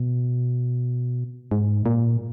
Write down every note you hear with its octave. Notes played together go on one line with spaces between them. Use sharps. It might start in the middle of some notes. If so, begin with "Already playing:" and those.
Already playing: B2
G#2
A#2